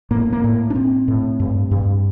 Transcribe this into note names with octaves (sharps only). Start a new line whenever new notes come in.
A2 A#3
A#3
A2
D4
A2 C4
A2
G2
G2